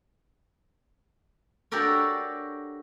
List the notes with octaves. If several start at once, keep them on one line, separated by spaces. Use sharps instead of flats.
D4 F#4 G4 A4 A#4 C#5